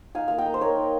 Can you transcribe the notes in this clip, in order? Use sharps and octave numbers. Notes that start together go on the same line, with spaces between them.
D#4 F5 G#5
A#3 F5
D#5 G5
A#3
C5
D#4 A#4 C#5
D#4